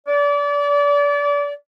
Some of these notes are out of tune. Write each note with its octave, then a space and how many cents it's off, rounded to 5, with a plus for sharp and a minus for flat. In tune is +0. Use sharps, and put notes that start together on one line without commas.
D5 -30